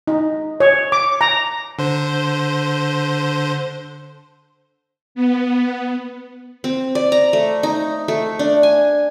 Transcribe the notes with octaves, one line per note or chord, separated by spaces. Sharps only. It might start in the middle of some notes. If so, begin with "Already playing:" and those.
D#4
C#5
D6
A#5
D3 C5
B3
C4
D5
A#5
A3
D#4
A3
D4
G#5